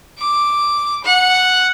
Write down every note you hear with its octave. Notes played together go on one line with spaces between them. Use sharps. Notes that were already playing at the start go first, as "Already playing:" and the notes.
D6
F#5